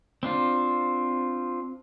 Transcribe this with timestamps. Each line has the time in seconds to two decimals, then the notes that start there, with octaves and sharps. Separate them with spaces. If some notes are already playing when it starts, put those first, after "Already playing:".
0.23 C4 D4 F4